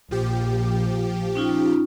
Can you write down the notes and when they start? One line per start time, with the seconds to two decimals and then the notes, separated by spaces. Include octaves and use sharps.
0.11 A#1 F3 G4
1.35 C#4 D#4 F4